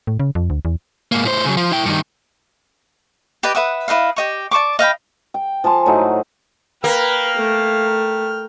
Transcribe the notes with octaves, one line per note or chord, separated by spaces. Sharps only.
A2
C#3
F2
D2
E2
G#2 A#3
A2 C5
C#3 F#3
F3
E4 G5
G2 D#3
G4 B4 D5 D#5
B4 E5 F#5 D#6
E4 B4 D#5 F5
G4 D#5 C#6
D5 A5 C#6 D6
D#5 F5 G5 B5
G5
F3 G#5 A5 C6
A2 F#3 D#4 F#5
A#3 B4 G5 F6
A3